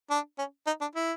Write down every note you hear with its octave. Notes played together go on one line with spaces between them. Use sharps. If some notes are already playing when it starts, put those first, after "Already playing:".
D4
C#4
D#4
D4
E4